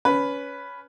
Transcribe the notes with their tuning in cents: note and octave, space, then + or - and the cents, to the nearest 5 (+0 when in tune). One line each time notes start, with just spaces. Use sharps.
C#4 +20 B4 +5